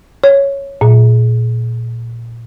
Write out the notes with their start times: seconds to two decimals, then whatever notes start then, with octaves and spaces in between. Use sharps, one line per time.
0.24 C#5
0.81 A#2